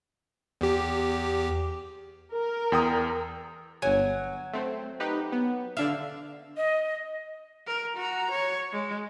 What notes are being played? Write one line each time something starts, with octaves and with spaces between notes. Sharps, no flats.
E2 G4
A#4
E2 G5 D#6
G1 F#3 G#5
A3 C4
D#4 G4 B4
B3
D3 D4 E5 F5
D#5
A#4
F#4 A#5
C#5
G#3